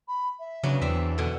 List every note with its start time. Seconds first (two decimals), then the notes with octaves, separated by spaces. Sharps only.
0.08 B5
0.39 E5
0.63 C#3 F#3 B3 D4
0.81 E2 C4 D5 E5
1.18 B2 D3